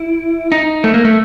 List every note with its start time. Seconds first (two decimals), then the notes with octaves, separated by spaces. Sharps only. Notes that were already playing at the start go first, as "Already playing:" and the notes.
Already playing: E4
0.52 D#4
0.84 A3
0.94 A#3
1.05 A3